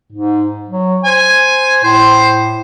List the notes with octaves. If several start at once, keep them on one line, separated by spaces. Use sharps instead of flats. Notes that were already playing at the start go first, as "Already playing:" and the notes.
G#2
F#3
C5 G#5
A2 C5